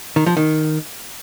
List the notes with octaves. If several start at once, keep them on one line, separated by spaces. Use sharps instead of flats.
D#3
F3
D#3